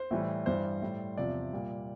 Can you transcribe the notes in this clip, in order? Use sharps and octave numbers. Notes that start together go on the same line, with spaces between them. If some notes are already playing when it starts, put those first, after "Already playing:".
Already playing: C5
A2 E3 G3
G2 E3 G3 C5
A2 G3
E2 C3 F3 D5
A#2 G3